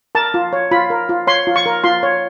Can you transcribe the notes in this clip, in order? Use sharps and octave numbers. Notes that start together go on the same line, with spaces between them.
A#4 A5
F4
C#5
F4 B5
A#4
F4
C#5 C6
F4
C#6
A#4
F4 C6
C#5